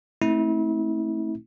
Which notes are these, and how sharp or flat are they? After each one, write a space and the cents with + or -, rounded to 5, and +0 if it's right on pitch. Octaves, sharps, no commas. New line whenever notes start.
A3 +0 C4 +20 E4 -35